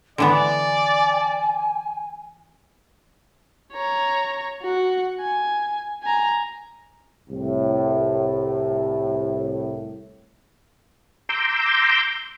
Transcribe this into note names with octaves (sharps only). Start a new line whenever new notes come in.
D3 E3 B3 D5 G#5
C#5 A#5
F#4 F#5
G#5
G#5 A#5
C2 A2
A#5 C6 D6 E6 G6